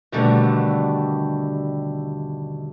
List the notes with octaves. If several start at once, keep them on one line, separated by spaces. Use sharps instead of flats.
D#2 B2 D3 G3 A3